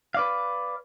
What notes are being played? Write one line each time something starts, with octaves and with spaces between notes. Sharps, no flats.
B4 D5 F5